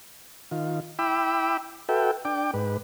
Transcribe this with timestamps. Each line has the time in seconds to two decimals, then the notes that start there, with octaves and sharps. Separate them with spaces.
0.51 D#3 F4
0.99 E4 G5 B5 D6 E6
1.89 F#4 A4 B4 E5 G5
2.25 D4 G5 D6
2.54 G#2 B4